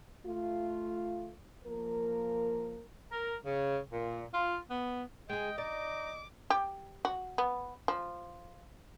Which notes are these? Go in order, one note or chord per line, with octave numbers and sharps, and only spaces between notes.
A3 F4
F3 A#3 A#4
A#4
C#3
A#2
F4
B3
G#3 G#4 D#5 G5 G#5
D#4 D5 D6
G4
F#4
B3
F3